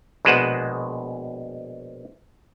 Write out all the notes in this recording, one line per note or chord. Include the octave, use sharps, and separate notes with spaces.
A#1 B2 G#3 B4 C5 F#5